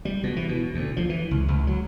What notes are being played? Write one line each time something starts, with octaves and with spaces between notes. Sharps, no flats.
G3
B2
E3
B2
D2
F3
E3
C#2
C#2
F#3